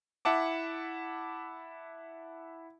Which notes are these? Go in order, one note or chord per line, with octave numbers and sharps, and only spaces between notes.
E4 E5 F#5 A5 D6